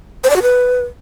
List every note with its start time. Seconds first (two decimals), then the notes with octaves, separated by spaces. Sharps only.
0.24 C5
0.30 D5
0.36 F#4
0.42 B4